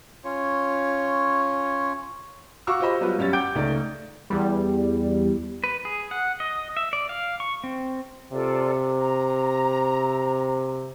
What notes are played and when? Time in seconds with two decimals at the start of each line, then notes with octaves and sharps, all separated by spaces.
0.24 C#4 F4 C#5
2.67 F#4 F5 C#6 D6 E6
2.80 F4 G4 C5 D#5 B5
3.01 F#3 G3 B3 F4 B4
3.19 F#2 G3 C#4 C#5 A6
3.33 F#5 G5 D6 G6 D7
3.55 C#2 A3 D#4 D5
4.30 E2 G3
5.64 B4
5.85 G#4
6.11 F#5
6.40 D#5
6.77 E5
6.93 D5
7.09 F5
7.40 C#6
7.64 C4
8.32 C3 F4 A4 D5
8.96 A#5